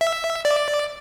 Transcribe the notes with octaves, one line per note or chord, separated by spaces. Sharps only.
E5
D5